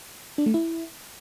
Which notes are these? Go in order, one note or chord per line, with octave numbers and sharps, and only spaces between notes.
D4
A3
E4